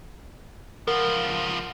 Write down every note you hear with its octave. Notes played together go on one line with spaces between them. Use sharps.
C#2 F3 A#4 F#5